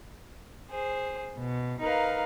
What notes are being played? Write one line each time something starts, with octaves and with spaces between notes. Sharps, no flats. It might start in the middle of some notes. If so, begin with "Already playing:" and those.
G#4 C5
B2
D#4 A#4 B4 F5